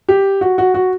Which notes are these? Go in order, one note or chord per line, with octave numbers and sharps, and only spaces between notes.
G4
F#4
F#4
F#4